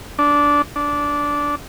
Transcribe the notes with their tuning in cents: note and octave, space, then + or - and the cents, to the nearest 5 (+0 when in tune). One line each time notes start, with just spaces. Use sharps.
D4 -15
D4 -15